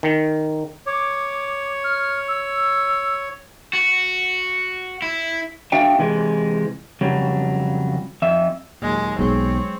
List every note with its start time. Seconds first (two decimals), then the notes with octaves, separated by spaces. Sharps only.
0.03 D#3
0.86 C#5 D6
1.84 F6
2.28 E6
3.73 F#4
5.02 E4
5.72 D4 F#4 E5 F5 G5
5.99 C3 E3 G#3
7.01 F2 C#3 F#3 G3
8.22 F2 E5
8.82 D#2 A#2 F#3 G#3
9.19 B1 F#3 G#3 C4 C#5